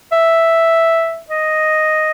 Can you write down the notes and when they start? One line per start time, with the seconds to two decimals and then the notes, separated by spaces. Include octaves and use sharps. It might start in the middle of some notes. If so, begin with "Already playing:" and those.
0.12 E5
1.30 D#5